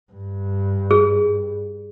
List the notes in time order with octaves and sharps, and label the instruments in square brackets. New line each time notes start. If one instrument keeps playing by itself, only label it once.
[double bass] G2
[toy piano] G#4